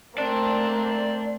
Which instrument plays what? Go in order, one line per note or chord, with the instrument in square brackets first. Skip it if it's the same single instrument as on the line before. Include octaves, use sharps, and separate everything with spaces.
[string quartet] A3 A#3 C4 [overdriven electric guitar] D5 A5